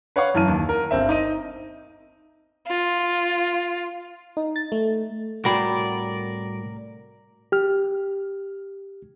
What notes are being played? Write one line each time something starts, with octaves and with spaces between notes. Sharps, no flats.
B4 C#5 F5 F#5 C#6
F#2 E3 A5 F6 D#7
D#2
A#4
G1 C4 E5
D#4 D#5 D#7
F4
D#4
A6
A3
C2 A2 F#4 A#4 D5 F#5 G5 B5
G4 F6